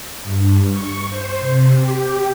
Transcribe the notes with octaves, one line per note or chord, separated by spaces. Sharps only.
G2
C#6
C5
C3
G4